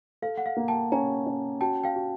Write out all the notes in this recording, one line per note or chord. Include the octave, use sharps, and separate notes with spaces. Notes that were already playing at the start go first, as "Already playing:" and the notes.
A4 F5
F#5
F5
A#3
G5 A5
C#4 G#5 A#5
C#4
F#4 G5 A5
F5 G5
F#4